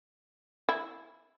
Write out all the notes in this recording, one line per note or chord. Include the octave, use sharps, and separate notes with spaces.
E4